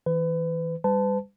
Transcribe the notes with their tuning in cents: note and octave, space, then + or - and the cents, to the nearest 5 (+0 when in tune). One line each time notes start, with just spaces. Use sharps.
E3 -30 B4 +30
G3 +20 B4 +40 A5 +0